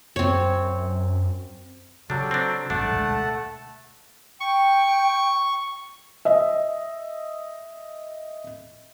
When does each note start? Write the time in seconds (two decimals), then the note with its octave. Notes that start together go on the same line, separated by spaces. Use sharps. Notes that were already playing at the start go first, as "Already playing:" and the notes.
0.16 F#2 C4 C#5
2.10 C#3 F#3 G3 D4 A4
2.31 C4 D4
2.70 A1 G2 A3 D4 F#5 A5
2.90 D2 B2 G#3
4.40 G5 C#6
6.25 D#5 E5